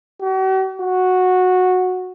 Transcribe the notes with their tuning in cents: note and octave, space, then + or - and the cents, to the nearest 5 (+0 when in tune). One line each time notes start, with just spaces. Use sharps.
F#4 +45
F#4 -10